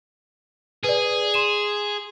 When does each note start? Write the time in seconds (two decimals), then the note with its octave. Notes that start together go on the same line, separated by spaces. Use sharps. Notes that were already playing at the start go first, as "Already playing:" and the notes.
0.84 G#4 B4 D5
1.34 C6 D#7 E7